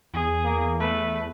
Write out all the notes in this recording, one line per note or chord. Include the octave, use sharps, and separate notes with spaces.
E2 G#4
A#3
A3 B4